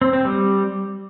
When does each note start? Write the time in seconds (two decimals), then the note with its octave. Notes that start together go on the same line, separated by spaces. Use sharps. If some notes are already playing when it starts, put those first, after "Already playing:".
0.01 C4
0.13 C4
0.25 G3